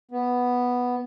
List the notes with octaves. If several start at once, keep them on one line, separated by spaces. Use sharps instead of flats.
B3